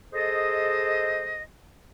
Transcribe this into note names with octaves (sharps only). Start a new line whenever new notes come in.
G#4 A4 C5 D#5